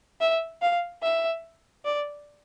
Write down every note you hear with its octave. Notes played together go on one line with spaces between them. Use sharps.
E5
F5
E5
D5